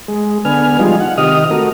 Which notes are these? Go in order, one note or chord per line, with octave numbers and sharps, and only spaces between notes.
G#3
D3 B3 G#5 F6
F3 G3 G#3 D#4 F4
F#5
C3 D#3 G4 D#5 D#6 F6
A3 F#4 A#4